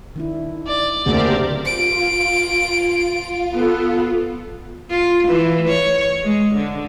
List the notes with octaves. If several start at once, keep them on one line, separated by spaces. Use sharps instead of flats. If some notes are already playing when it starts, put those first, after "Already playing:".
D#3 D4 E4
D5
F#1 D2 A#3 C4 D4 G4 G#4 A#4
F4 D7
B3 A4
F4
E3
C#5
G#3
D3